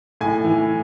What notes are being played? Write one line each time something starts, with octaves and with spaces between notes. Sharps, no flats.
A2 G#5
E3